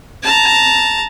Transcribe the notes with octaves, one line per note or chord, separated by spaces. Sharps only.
A5 A#5